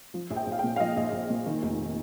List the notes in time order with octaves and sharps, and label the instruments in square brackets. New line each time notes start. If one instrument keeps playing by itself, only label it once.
[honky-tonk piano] F3
A#1
G5
A#1
F5
A#2 G5
F5
F3 D#5
A#1
A#1
A#2
D#3
F1